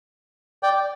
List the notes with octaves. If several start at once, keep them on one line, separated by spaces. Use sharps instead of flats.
D5 G5